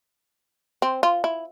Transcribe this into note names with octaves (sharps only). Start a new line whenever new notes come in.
C4
F4
E4